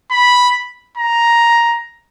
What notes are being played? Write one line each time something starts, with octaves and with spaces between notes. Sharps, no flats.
B5
A#5